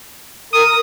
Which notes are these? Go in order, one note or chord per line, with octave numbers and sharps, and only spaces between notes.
A#4 D#6